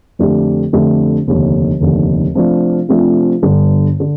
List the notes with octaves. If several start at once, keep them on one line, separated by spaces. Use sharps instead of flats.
F2 D3 A3 D4 G4
F2 D3 A3 D4 G4
F1 D#2 D3
F1 D#2 D3
C3 F3 A3 D4 F4
C3 F3 A3 D4 F4
G1 G2 D3
D3